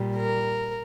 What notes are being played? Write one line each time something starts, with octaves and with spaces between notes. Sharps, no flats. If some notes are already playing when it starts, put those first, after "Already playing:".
Already playing: A#2 G3
A#4